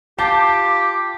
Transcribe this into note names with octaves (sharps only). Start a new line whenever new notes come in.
F4 G4 A5 D6